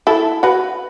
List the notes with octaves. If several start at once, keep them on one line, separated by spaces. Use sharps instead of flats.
E4 A4
F#4 B4